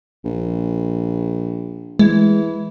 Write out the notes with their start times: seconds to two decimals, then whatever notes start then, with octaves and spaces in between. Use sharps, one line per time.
0.24 A#1
1.99 E3 G#3